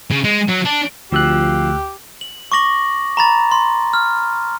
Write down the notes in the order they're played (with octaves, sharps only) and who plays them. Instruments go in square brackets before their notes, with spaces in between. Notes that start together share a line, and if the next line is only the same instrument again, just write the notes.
[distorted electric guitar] C#3
G#3
F#3
D4
[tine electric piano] D2 E6 F#6 [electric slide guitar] F3 C4 F4 [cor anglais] G4
[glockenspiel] F#7
C#6 D6 A#6 F#7
A#5 B5 A6
C6
F6